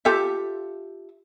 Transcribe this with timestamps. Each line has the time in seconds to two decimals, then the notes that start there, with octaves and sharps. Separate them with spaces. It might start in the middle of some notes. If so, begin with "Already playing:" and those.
0.05 F4 G4 A4 E5